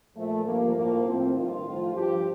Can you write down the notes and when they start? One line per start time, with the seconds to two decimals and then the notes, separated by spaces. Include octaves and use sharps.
0.15 A#2 F3 A3
0.45 G2 F3 A#3
0.75 A2 F3 A#3
1.04 A2 F3 C4
1.35 G2 D#3 F4
1.64 A2 F3
1.94 G2 F3 G4